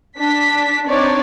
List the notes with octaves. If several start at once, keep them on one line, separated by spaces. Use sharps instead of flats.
D4 B6
C4 D4 D#4 C#5 D5